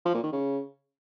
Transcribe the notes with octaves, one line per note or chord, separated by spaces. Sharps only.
F3
A#2
D#3
C#3